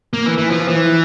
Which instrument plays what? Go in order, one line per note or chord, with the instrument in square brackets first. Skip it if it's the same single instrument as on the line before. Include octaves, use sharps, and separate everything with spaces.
[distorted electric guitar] A#3
E3
E3
F3
E3